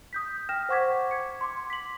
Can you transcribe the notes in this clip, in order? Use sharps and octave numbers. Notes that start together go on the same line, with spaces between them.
D#6 G6 B6
G5 F6 A#6 E7
C5 F#5 C#6 D6 G#6 B6
G#6 C#7
C6 D6
B6 F#7